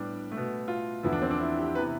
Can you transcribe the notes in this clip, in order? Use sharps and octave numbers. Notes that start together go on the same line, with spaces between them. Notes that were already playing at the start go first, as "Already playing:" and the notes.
Already playing: A2 G3 B3 D4
A3
B2
F4
E2 D3 F3 B3 E4
D4
C4
D4
E4
G4
C3 E3 B3 B4